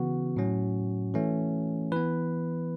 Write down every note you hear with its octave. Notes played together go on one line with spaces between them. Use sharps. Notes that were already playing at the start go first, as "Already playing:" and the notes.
Already playing: C#3 E3 B3 F#4
A2 F#3 C#4
E3 A3 C#4
E3 B3 B4